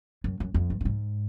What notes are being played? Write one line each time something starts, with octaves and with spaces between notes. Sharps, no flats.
F#2
F#2
F2
G2
G2
G#2